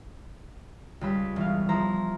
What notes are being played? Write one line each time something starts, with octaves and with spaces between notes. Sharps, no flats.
C#2 G3 B5 E6
E1 F5
F3 E4 C5 A#5